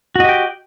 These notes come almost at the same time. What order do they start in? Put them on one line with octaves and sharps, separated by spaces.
F#4 D#5 G4 G5